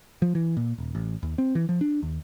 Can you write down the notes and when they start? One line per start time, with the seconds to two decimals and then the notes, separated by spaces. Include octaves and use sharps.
0.22 F3
0.35 E3
0.57 A#2
0.78 D#1
0.95 A1
1.23 D#2
1.38 C4
1.55 E3
1.69 F3
1.81 D4
2.03 D#2